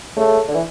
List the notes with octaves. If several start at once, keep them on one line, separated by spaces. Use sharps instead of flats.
C#3 A3
D3
E3